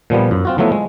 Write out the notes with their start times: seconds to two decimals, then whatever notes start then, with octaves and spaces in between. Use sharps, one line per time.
0.10 A#2 F3 G3 B3
0.31 F#2
0.45 C4 F4 F#4
0.58 F3 F#3 A3 B3 E4 B4
0.72 G#3